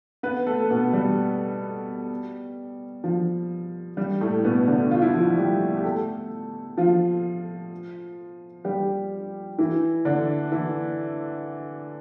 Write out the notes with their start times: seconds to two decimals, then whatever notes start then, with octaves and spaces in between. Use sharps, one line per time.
0.23 B3 B4
0.47 A3 A4
0.70 B2 B3
0.93 G3
3.04 F3
3.97 G3
4.21 A2 A3
4.44 B2 B3
4.67 D3 D4
4.91 F4
5.02 E4
5.14 F3 F4
5.38 G3 G4
5.77 G4
5.84 A3 A4
6.78 F3 F4
8.65 G3 G4
9.58 E3 E4
10.05 D3 D4
10.52 E3 E4